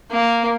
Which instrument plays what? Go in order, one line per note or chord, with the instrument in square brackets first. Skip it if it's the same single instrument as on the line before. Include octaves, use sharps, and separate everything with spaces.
[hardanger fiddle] A#3